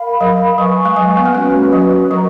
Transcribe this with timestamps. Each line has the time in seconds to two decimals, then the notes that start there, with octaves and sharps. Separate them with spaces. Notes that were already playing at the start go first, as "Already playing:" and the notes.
Already playing: A#4 F5 B5
0.21 F#3
0.58 F#3 B4 F5 G#5 C#6
0.85 G#3
0.96 F#3
1.17 B3
1.26 A#3
1.34 G#3 C#4 F#4 B4
1.73 F#3
2.11 F#3 A#4 D#5 A#5 C#6